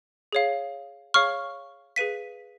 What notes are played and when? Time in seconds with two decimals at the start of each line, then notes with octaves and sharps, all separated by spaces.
0.33 G#4 C#5 F5
1.14 G#4 C#5 F5 C#6 F6
1.96 G#4 B4 F5 B6 D#7